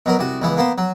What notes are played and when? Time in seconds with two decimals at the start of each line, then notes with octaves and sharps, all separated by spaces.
0.06 B2 F#3 A#4
0.19 C2 F#4
0.42 C#2 E3 B3
0.57 A#3 B3 C5
0.78 F#3